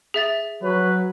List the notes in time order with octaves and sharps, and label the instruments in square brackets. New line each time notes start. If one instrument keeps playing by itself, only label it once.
[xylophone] G#4 E5 A6
[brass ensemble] F#3 [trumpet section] B4 C#5